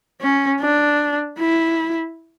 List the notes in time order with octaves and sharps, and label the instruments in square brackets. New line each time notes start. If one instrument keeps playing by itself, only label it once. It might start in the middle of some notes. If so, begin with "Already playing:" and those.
[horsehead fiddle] C#4
D4
E4